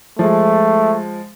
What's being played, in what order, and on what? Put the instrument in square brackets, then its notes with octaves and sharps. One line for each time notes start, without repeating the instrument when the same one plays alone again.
[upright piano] F3 G#3 [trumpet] A3